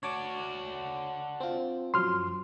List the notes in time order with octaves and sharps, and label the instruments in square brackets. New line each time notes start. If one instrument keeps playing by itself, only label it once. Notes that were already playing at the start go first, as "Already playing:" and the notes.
[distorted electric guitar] D4 F#4 [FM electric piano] C#5 A5 D6
[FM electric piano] C4 F4
[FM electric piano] F#2 F3 F#3 [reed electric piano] C6 F6